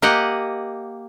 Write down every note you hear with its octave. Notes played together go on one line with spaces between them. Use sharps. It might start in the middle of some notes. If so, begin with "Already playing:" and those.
A#3 G4 D#5 F#5